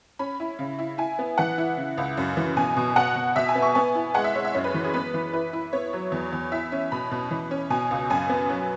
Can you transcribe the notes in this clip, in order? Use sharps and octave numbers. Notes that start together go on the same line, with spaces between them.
C#4 B5
E4
C#3
E4
E4 G#5
B3
E3 F#5
E4
C#3
C#2
F#2
E3
B2 G#5
B2
B2 F#5
B2
B2 E5
G#5
B3
C#6
B3 G#5
E4
G#3 F#5
E5
G#3 C#5
E5
F#2 C#5
B4
E3
G#4
B3 B4
E3
E4 B4
E4
B3 C#5
F#3
E2
E2
E4 E5
C#4
B2 B5
B2
E3
C#4
B2 G#5
C#2
F#2 G#5
B3
F#3